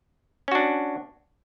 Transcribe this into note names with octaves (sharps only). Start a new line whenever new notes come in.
C#4 D4 F#4